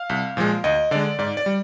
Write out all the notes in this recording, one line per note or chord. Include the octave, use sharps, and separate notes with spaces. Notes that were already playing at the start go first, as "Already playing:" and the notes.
Already playing: F5
C2
A#2 F3 G#3
D2 D#5
D3 G#3 D5
G#2 D5
D5
G3